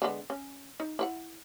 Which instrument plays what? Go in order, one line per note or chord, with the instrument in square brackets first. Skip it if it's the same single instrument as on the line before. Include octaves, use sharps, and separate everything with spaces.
[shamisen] D3 G#3 B3
C#4
D#4
E4 B4 F#5